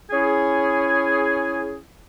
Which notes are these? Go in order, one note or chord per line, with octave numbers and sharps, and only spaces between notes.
C#4 E4 G#4